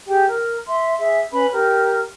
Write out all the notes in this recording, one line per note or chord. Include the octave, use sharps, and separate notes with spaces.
G4 G#4 G5
A#4
E5 C6
G#4 E5
C#4 B4 B5
G4 A#4